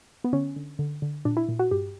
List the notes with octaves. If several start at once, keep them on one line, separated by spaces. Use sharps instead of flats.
B3
D3 C#4
D3
D3
D3
A#2 D4
E4
A#2
F#4
G2 G4